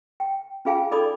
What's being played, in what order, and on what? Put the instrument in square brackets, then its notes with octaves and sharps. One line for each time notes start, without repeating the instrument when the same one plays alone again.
[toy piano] G5
C#4 F4 G#4 F5 G5 G#5
D#4 A4 D5 B5 D6 D#6